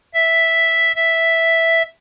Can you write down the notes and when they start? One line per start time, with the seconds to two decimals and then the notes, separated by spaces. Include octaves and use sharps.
0.14 E5
0.96 E5